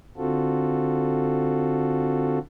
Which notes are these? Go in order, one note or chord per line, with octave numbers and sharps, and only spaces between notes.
D3 C4 F4 F#4 A4